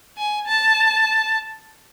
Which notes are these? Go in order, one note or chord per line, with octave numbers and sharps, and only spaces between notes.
G#5
A5